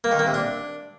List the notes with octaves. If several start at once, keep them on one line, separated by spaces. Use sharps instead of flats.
A#3
D#3
A#3
C3
D4